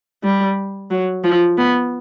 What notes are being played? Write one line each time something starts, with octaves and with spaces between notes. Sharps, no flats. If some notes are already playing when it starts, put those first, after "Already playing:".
G3
F#3
F3
B3